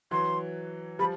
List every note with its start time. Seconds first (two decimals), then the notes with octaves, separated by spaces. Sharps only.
0.11 E3 F#3 C6
0.99 F3 G3 B5